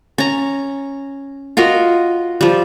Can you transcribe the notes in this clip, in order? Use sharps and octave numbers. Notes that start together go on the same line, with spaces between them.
C#4 A#5
F4 F#4 A#4 D#5
F3 G3